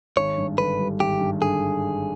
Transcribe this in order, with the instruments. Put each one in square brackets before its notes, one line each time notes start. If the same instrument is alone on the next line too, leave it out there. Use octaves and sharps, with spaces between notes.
[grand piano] G#1 [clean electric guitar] C#5
[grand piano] G2
[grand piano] D3 [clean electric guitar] B4
[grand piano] G3
[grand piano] G#1 [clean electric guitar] G4
[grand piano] G2
[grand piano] D3 [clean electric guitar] G#4